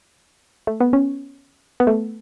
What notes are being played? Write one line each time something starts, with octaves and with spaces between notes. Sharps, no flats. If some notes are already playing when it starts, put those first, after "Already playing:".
A3
B3
C#4
B3
A3